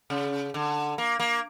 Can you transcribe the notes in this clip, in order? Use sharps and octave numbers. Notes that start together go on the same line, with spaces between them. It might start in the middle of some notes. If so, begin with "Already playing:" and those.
C#3
D3
A#3
A#3